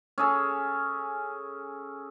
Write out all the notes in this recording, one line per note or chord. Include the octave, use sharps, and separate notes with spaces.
C#4 G#4 A4